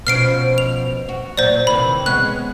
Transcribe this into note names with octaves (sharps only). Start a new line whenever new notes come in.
B2 F3 C#4 F6 C7 D7
F7
F#4
A#2 F#3 C5 D5
C3 D#3 E3 B5
G#3 B3 C#4 F#6